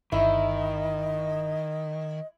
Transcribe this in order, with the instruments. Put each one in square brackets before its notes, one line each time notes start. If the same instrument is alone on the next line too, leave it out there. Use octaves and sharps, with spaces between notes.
[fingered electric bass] G1 [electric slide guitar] D#3 [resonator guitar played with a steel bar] E4 [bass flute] D#5